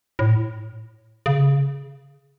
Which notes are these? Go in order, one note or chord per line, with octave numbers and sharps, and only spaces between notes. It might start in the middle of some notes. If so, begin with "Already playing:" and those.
A2
C#3